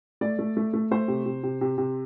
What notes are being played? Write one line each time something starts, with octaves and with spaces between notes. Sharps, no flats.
A3 D5
A3
A3
A3
A3 C5
C3
C3
C3
C3
C3